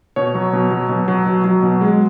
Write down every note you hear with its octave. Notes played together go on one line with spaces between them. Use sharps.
B2 C#5
F#3
B2
F#3
B2
F#3
B2
F#3
B2
G#3